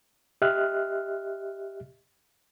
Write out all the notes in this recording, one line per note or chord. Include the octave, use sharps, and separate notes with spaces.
G4 D#5 E5 F6 F#6